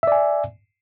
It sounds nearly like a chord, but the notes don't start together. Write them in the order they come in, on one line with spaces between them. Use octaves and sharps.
E5 D5 G#5